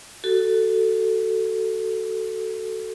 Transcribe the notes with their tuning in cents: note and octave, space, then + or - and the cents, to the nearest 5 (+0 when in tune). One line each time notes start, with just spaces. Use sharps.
F#4 +20 A4 +10